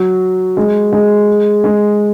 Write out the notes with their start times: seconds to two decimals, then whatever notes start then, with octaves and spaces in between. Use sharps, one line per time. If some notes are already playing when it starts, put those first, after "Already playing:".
Already playing: F#3
0.57 G#3
0.93 G#3
1.64 G#3